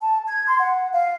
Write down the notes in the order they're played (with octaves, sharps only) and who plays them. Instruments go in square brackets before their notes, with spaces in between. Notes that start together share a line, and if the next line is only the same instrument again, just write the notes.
[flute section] A5
G#6
C6
F#5
F5